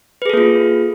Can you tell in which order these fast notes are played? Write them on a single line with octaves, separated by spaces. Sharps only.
B4 G#4 A4 A#3 F4